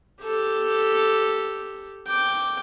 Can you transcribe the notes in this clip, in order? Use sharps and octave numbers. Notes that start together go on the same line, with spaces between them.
G4 A4
G5 D6